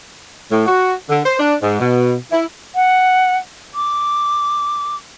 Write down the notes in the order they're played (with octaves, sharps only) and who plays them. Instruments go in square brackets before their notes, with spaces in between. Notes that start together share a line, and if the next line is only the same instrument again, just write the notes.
[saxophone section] A2
F#4
D3
C5
D4
G#2
B2
E4
[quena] F#5
D6